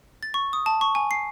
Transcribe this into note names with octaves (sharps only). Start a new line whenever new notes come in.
A6
C#6
D#6
A5
C#6
G#5
C7